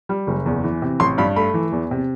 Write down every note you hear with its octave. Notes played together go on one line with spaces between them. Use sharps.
G3
F#1
E2
E3
C3
A1 C6
G2 B5
A3 B5
E3
E2
C3